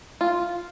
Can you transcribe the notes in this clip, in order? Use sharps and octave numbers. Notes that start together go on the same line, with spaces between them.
F4